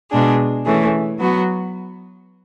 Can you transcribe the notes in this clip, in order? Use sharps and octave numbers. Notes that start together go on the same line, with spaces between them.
B2 G#3 D4 G#4
E3 A3 C#4 G#4
F#3 B3 F#4